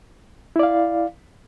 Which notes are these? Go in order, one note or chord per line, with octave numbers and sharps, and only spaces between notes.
E4 D5 F5